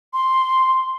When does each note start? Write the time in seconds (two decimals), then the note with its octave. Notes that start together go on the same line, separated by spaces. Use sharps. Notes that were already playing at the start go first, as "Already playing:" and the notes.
0.13 C6